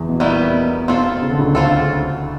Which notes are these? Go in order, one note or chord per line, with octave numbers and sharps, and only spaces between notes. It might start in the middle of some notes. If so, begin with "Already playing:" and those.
Already playing: E2 E3
B2
A#2 D#3 G3 B3 E4
B2
B2 C4 F4 A4
C#3
D3
C#2 C#3
D2 D3 C4 F4 A4